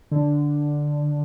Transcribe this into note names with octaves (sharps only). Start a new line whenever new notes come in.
D3